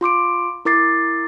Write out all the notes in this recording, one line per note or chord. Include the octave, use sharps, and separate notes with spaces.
F4 C6 D6 D7
E4 A#4 D6 A6 C7